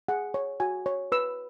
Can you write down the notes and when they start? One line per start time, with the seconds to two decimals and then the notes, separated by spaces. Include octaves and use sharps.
0.08 G#4 F#5
0.34 C#5
0.60 F#4 G#5
0.86 C#5
1.12 B4 E6